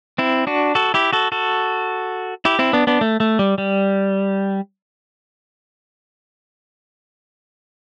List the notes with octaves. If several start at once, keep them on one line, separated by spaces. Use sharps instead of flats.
C4 E4
D4 F#4
F#4 A4
E4 G4
F#4 A4
F#4 A4
E4 G4
C4 E4
B3 D4
B3 D4
A3
A3
G3
G3